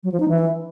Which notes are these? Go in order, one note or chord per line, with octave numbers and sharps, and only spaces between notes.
F#3
F3
D#4
E3